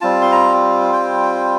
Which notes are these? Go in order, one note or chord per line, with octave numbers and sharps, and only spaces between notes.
G3 C4 F4 A5
C6
A#5
G5